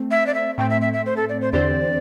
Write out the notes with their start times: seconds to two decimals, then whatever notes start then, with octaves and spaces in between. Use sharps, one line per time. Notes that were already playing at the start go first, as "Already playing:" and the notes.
Already playing: A3 C4
0.11 E5
0.27 D5
0.34 E5
0.58 A2 A3 C4 G5
0.70 E5
0.81 E5
0.93 E5
1.06 C5
1.17 A4
1.29 D5
1.41 C5
1.53 E2 D3 C4 G4 C5 D5